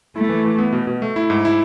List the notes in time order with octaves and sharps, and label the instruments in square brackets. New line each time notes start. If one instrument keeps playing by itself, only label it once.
[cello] A3 [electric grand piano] E4
[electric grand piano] E3
E3
B3
B2
B2
A3
E4
G#2
E4